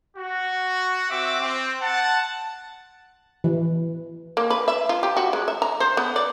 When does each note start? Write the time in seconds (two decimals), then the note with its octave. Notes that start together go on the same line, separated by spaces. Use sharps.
0.17 F#4
1.10 C4 F#4 E5 D6
1.41 C4
1.81 F#5 A5
3.44 E3
4.37 A#3
4.50 B4
4.68 E5
4.89 F4
5.03 G4
5.17 F#4
5.33 G#3
5.48 E5
5.62 A#5
5.80 C5
5.97 B3
6.16 D5